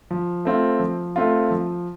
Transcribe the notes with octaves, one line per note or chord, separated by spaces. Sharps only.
F3
A3 C4 F4
F3
A3 C4 F4
F3